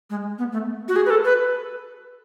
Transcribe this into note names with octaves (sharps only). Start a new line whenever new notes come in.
G#3
B3
A3
F#4
G#4
B4
A4
B4